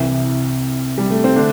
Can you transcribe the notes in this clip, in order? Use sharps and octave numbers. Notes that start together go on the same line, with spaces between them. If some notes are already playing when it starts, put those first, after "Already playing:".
Already playing: C2 C3 E3
G3
A3
C4
D3 A3 D4